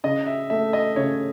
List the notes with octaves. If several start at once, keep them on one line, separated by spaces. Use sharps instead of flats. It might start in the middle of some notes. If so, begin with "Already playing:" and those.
C#3 D#5
E5
A3 E5
D#5
C#3 C#5